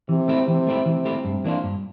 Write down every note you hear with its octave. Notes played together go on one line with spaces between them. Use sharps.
C3 E3
A3 C4 E4 G4
C3 E3
A3 C4 E4 G4
C3 E3
A3 C4 E4 G4
G2 C3
E3 A#3 D4 F4
G2